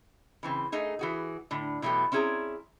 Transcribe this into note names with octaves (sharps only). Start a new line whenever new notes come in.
C#3 E3 C4
A3 D#4 G#4
E3 F#4 G#4
A2 D3
B2 E3 F#3 A3 G4
C4 C#4 E4 G#4 D5 A#5